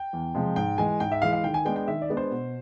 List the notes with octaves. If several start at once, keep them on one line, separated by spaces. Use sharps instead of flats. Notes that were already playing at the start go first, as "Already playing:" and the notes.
Already playing: G5
E2
C3 F3 G#3
G#2 G5
E3 G#3 G#5
G#2 G5
E5
E3 G#3 F5
F5
D#3 G5
G#5
G#3 B3 D4 G5
G5
D#3 E5
D5
G#3 B3 D4
C5
B2